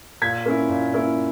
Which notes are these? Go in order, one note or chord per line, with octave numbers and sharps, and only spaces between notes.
A#2 G#6 B6
A#3 C#4 E4
A#2
A#3 C#4 E4